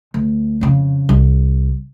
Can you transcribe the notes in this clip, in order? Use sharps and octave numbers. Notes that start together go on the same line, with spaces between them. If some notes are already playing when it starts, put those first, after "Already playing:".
D2
F2 C#3
C2